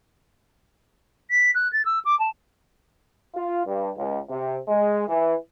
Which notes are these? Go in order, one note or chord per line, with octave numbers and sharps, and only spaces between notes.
B6
F#6
A6
E6
D6
A5
F4
G2
C#2
C3
G#3
E3